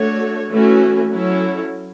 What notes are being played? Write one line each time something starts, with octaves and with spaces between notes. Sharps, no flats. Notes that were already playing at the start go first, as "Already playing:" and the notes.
Already playing: A3 D4 F#4 A4 C#5
E3 A3 C#4 F#4
F#3 C#4 E4 A4 C#5